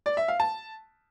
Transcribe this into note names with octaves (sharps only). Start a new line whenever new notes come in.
D5
E5
F5
A5